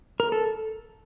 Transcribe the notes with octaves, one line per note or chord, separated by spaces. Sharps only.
A#4
A4